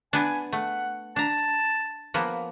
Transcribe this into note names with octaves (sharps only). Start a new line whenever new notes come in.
B3 D4 G#5
A3 F#5
D4 A5 A#5
F3 A#3 B3